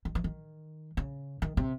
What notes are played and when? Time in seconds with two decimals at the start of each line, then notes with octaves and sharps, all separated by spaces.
0.05 D#3
0.15 E3
0.24 D#3
0.97 C#3
1.42 D#3
1.57 C3